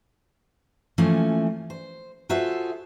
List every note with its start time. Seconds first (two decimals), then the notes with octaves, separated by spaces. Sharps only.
0.98 E3 F3 A3 A#3 C#4
1.70 C5
2.29 F4 F#4 G#4 A4 C5 E5